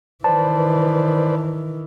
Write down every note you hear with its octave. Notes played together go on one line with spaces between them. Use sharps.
D#3 E3 B4 C5 D5 A5